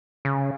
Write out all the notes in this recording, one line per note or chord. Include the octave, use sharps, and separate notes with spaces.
C#3